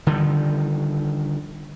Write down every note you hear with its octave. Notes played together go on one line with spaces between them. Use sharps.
D3 D#3 F3 G3